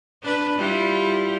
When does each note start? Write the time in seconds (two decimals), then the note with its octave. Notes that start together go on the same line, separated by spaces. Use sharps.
0.23 D4 B4
0.58 G3 E4 F4